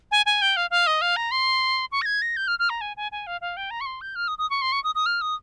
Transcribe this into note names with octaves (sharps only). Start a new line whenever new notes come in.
G#5
G#5
G5
F5
F5
D#5
F5
A#5
C6
C#6
A#6
G#6
A#6
G6
F6
F6
A#5
G#5
G#5
G#5
F5
F5
G5
A#5
C#6
C6
G6
F6
D#6
D#6
C#6
C6
C#6
D#6
D#6
F6
D#6